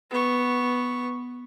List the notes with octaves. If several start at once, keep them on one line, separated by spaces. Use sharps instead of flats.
B3 C#6